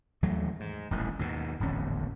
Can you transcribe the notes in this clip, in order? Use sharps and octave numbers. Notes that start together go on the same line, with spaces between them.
D#2 E3 F#3 A3
G#2
D#1 A1 D#3
D#2 G#2 B2
D1 G#1 E2 C#4